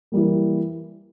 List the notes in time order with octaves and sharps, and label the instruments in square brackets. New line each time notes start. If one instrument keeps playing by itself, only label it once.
[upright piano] E3 G3 A#3